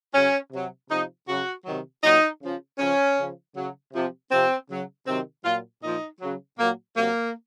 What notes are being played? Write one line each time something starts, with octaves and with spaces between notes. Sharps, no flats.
C#3 F#3 C#4
C3 F#3
C3 F3 D#4
C#3 F#3 F#4
C3 D#3 F#3
A#2 F#3 D#4
C#3 F3
C#3 F3 C#4
C#3 F3
C#3 F#3
C3 F3
C3 F3 C4
C#3 F#3
C3 D#3 F#3 C4
A#2 F#3 F4
A#2 F3 D#4
C#3 F#3
A#2 F#3 A#3
C3 F#3 A#3